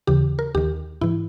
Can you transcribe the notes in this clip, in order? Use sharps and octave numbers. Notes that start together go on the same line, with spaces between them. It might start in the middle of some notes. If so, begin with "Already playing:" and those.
D#2 C#3 E3 G4
A#4
D#2 D#3 G4
G#2 E3 E4